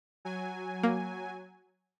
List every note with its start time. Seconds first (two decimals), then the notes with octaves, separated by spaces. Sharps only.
0.25 F#3 G#5
0.83 A#3